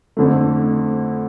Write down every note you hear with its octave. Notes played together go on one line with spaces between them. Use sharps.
F2 D3 A3